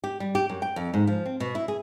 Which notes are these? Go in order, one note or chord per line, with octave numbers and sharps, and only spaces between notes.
G4
G3
G4
F#2
G5
F2
G#2
F3
C4
B2
E4
G#4